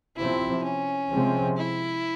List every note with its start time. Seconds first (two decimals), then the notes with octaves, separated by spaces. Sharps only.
0.16 C3 F3 C4 E4
0.63 C#4
1.10 C3 F3 G#3 C4
1.57 E4